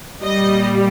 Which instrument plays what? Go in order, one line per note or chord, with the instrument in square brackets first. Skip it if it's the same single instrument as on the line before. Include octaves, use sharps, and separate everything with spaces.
[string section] A#2 G3 D#5